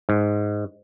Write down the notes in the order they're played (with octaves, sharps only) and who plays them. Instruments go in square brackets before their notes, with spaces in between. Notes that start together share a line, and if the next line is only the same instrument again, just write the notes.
[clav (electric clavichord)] G#2